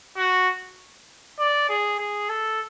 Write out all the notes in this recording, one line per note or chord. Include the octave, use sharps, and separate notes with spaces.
F#4
D5
G#4
G#4
A4